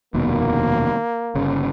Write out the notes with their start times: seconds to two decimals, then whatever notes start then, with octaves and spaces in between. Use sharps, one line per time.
0.14 F1 D#2 B2 A#3
1.35 G1 C#3